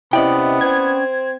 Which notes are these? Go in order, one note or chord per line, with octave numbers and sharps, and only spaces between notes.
C3 B3 C#4 E4 D5 D#5 G5
C4 G#6